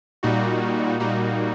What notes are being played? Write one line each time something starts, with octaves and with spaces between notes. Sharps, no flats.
A#2 G3 A#3 D#4 F#4
A#2 G3 A#3 D#4 F#4